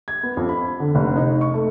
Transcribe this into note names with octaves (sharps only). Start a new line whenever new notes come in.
G#6
B3
F2
B5
D3
F1
D#4
C#6
A3